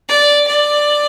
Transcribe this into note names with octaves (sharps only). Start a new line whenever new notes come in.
D5
D5